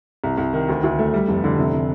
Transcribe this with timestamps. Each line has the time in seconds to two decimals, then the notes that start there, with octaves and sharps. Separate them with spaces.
0.24 C2
0.38 C2
0.53 D#3
0.69 D2
0.84 D2
0.98 A3
1.14 G3
1.28 F1
1.44 D3
1.59 C3
1.73 C3